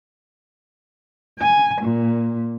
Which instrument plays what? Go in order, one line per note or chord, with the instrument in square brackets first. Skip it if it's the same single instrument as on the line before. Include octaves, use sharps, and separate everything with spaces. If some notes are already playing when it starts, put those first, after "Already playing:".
[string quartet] G#5
A#2